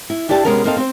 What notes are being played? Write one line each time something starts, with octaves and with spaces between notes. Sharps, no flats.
E4
D4 E4 G4 D5 A5
C3 G#3 B3 C#4 A#4
A#3 C4 A4 D#5 F5
C4 C5